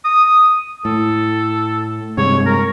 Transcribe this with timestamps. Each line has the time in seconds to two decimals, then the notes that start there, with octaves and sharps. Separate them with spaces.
0.04 D#6
0.85 A2 A4
2.17 G2 C3 G#3 C#5
2.46 A#4